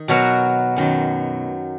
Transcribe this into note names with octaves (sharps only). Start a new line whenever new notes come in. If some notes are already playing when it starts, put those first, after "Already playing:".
Already playing: D#3 D#4
B2 F#3 B3 F#4 A#4
F#2 D#3 F#3